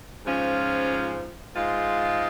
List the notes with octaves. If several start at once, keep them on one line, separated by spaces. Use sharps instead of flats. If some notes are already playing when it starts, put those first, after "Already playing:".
G#2 F3 C#4 F4
G#2 G#3 F4